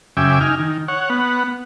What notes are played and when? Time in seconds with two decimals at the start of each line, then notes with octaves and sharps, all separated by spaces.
0.17 F#2 C#3 E5 G5 G#5 D6
0.41 D#4 G#5 F6
0.59 D#3
0.88 C#5 F#5
1.10 B3 F#5